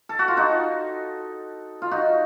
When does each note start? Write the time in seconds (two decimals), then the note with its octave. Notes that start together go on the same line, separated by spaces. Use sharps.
0.09 A4
0.19 F#4
0.28 F4
0.37 D#4 F#4
1.82 F4
1.91 D#4 F#4